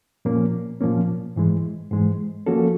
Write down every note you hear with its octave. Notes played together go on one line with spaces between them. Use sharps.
A#2 F3 A#3 C#4
A#2 F3 A#3 C#4
G#2 E3 G#3
G#2 E3 G#3
F3 A#3 C#4 F#4 A4